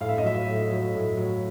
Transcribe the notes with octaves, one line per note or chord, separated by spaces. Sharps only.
A2 F5
E5
D#5
F#3 E5
A2
F#3
A2
F#3